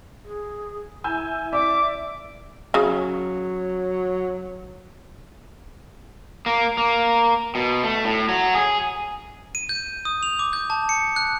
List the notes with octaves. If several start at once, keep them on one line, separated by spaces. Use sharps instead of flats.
G#4
E4 G#5 E6 G6
D5 E5 D6
C#3 F#3
A#3
A#3
B2
A3
A2
F#3
G#4
D#7
G6
D#6
F7
D6
G6
A5
C#7
F#6